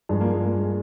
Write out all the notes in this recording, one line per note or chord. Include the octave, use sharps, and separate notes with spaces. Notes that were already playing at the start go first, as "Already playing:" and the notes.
G2 F3 G#3
A#3
G#3
A#3
G#3